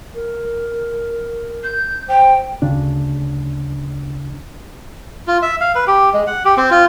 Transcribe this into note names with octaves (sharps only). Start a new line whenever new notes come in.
A#4
G6
C5 G5
D2 C#3 D4
F4
E5
F5
B4
G4
G#3
F#5
G4
C4
F4